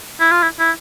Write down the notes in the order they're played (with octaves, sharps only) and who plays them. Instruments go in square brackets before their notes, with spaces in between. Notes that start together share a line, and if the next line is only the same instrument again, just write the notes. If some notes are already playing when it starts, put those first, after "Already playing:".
[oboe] E4
F4
E4
E4